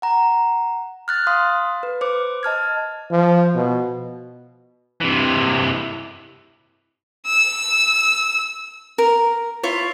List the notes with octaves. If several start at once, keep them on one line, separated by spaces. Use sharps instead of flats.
F#5 A#5
F6 F#6 A6
F5 C6 D#6
B4
C5 D6
D#5 A5 F6 G#6
F3
B2
C3 E3
E6
A#4
E4 F4 C#5